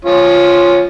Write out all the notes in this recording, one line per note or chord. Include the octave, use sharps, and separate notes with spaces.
F3 C#4 F4